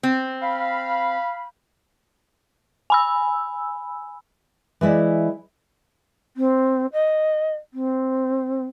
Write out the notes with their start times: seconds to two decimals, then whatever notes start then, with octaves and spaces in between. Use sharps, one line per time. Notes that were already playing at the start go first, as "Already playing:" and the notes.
0.03 C4
0.43 F5 B5
2.90 G#5 B5 E6
4.81 E3 G#3 E4 D5 E5
6.36 C4
6.92 D#5
7.73 C4